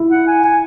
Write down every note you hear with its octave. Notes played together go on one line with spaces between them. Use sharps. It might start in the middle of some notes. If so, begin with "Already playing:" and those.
Already playing: E4
F#5
G#5
G#5